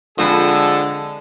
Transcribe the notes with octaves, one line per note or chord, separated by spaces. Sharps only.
D3 F3 G#3 C4 A4 B4